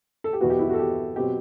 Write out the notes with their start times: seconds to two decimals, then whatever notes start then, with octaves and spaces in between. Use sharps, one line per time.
0.24 A4
0.33 G4
0.41 E2 B2 F#3 B3 F#4
0.50 G4
0.59 E4
0.69 F#4 A4
0.79 G4
1.16 B2 F#3 C4 G4